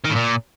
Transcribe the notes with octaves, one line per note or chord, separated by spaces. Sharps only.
D#3
A2
A#2